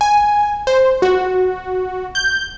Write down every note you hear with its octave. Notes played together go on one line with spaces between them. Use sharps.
G#5
C5
F#4
G6